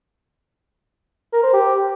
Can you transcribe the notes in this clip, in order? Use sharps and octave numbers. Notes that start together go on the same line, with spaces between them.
A#4
C5
G4